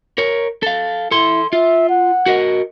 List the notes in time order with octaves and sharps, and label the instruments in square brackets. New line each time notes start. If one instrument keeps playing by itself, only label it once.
[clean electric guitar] A#4 C#5
A4 F5
[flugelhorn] E4 [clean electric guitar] A4 C6
[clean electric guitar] F4 [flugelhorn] E5
[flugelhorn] F#5
[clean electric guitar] F#4 A#4 D#5